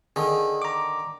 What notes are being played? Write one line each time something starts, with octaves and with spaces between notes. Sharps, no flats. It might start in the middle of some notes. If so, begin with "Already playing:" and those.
D3 D#3 G#4
A#5 D6